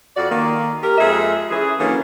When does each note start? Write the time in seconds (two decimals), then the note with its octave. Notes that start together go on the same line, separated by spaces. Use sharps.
0.16 F2 F#4 D5
0.30 D#3 A#3
0.82 G4 A#4
0.98 F2 G#3 G#4 E5
1.51 E3 C#4 G#4
1.79 D3 E3 F#3 A#3 C#4